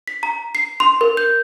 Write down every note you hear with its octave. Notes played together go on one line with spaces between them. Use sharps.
B6
A#5
C7
C6
A#4
G6